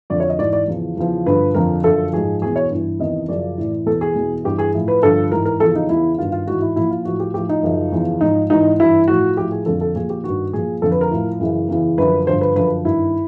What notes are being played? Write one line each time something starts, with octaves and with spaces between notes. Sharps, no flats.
F2 D3 F3 D5
C#5
D#5
G#2 E3 D5
D5
E2 C#3 F3
E2 C#3 F3
G2 D3 F3 B4
F2 D3 F3 A#4
F#2 D3 F3 A4
G#2 F3 G#4
E2 B2 G#4
C#5
G2 E3
E2 C3 D#3 D#5
F#2 C#3 F3 D5
A2 E3
E2 B2 A4
G#4
E2 B2
G2 E3 G4
G#4
A2 F3
B4
G2 D3 F3 A4
G#2 E3 A#4
A#4
E2 C#3 F3 A4
D#4
E2 C#3 E3 E4
G2 D#3 F4
F4
G#2 E3 F#4
E4
A#2 F3 E4
F4
A2 F3 F#4
G4
A2 F3 G4
D#4
F#2 C#3 F3
E2 C#3 F3
G#2 F3 D#4
G#2 E3 D#4
G2 E3 E4
A2 F3 F#4
A2 F3 G4
G#4
F2 D3 F3 A4
A4
A#2 F3 G#4
G4
G2 D#3 F#4
A#2 F3 G#4
F2 D3 F3 A4
B4
A#4
A2 F3
F#2 C#3 E3
E2 C#3 E3
F#2 D3 F3 B4
G2 D3 F3 C5
B4
F#2 D3 F3 B4
G2 D#3 E4